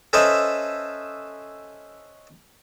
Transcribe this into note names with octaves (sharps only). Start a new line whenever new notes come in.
C#4 A4 B4 C5 D#5 E5